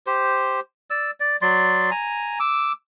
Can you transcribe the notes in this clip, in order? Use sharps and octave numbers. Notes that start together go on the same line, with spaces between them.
G4 C5
D5 E6
D5
F#3 D5 C6
G#5 A#5
D6 E6